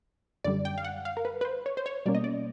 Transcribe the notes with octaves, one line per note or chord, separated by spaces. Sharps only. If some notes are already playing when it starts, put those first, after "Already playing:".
F#2 D3 G3 D5
G5
F5
F#5
F5
A#4
B4
B4
C5
C#5
C5
C#5
B2 G3 A#3 C#4 D5
D#5
D5